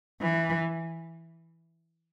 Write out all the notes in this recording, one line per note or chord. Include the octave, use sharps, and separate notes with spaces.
E3